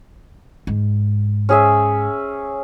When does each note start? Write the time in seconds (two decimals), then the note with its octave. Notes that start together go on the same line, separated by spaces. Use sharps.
0.67 G#2
1.49 C#4 G#4 E5